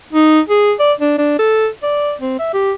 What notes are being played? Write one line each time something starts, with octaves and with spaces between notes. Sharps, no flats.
D#4
G#4
D5
D4
D4
A4
D5
C4
E5
G4